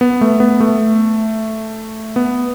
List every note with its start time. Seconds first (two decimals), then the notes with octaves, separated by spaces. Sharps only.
0.01 B3
0.21 A3
0.40 B3
0.60 A3
2.16 B3